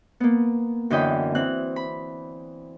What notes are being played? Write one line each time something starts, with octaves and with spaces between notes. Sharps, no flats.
A#3 B3
F#2 D3 E3 D#5 G5 B5
E3 C4 F#6
B5